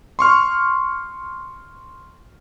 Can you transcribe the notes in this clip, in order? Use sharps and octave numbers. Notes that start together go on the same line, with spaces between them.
C6 C#6 F6